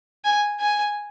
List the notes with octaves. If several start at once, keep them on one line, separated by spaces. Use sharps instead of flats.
G#5
G#5